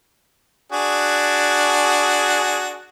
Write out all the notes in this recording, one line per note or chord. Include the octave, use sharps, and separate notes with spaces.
D4 F#4 G#4